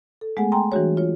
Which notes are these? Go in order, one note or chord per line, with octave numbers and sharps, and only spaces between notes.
A4
G#3 A3 B3 G#4 F#5 G#5
G5 G#5 A#5 C6
E3 G3 D4 F#4 G#4 C#5
F4 C#5